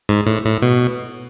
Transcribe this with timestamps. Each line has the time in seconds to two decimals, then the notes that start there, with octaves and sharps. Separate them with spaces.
0.09 G#2
0.26 A2
0.45 A2
0.62 B2